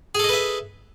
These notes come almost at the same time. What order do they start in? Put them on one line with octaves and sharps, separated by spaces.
G#4 A4 D#5 B4 E5